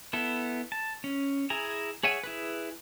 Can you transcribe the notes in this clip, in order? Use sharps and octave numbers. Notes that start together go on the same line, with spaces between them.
B3 E4 A4
A5
C#4
E4 G#4 G#5 A#5
G#4 C#5 E5 F#5 G#5
E4 G#4 B4